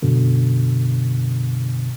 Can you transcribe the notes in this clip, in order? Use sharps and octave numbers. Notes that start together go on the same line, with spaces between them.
F#2 B2 D3